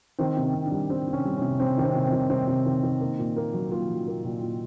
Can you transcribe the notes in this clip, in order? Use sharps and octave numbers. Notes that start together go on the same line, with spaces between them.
D#3 C4
C3
C4
C3
D4
G3
G3 C4
C3
C#4
G3
C3 C#4
C3 C4
D#3
C4
C3
C4
D#3
C3 C4
C3
D#3
D#3
A#3
A#2
A#3
F#3
A#3 F4
F#3
A#3
A#2
A#2